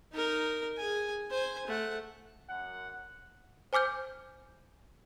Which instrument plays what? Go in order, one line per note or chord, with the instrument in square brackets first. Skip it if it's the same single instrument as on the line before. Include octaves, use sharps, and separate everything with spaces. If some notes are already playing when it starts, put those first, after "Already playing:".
[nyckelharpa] D#4 A#4
G#4 G#5
C5 G#5
A3 F#5
[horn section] F#2 F#5
[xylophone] C5 G#5 D6 F6 G6